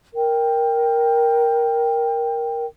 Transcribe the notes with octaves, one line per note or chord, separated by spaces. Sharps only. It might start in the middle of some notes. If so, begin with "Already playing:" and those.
A#4 G5